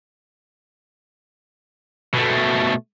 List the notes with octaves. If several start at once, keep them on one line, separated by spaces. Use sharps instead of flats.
B2 A3